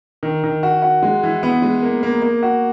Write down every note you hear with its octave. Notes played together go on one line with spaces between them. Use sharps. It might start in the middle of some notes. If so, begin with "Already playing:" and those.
D#3
D#3
F#4
F#4
G#3
E3
B3
G#3
A#3
A#3
A#3
F#4